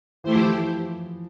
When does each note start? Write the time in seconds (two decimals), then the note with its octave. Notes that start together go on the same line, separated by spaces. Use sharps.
0.24 E3 A3 E4 G4 C5
0.35 F3
0.40 E3